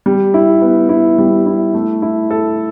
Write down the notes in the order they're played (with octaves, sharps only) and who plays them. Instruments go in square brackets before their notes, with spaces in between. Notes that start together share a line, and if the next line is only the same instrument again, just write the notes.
[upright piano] G3
E4
B3
E4
G3
E4
A3
E4
A4